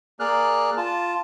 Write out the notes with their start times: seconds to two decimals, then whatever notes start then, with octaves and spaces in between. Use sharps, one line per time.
0.20 A#3 G#4 D5 F6 F#6
0.77 F4 A5